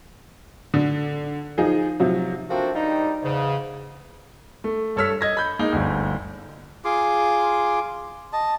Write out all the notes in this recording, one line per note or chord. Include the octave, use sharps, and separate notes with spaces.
D3
F3 D#4 G#4
C3 F3 F#3
F3 A3 A#3 C4 D4 F#4
D#3 G3 D4 D#4
E2 G#2 C#3
A3
G2 A4 C#5 E6 F6 B6
D#5 G#6 A#6
B5 G6
G#3 A#3 D#4
G1 D2
F4 G#4 C6 D6
D#5 A5